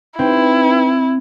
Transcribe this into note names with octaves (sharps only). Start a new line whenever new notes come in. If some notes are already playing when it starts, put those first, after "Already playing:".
C4 D#4 E4 B4 G5